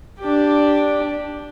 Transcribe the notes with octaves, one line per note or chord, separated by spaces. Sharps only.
D4 G4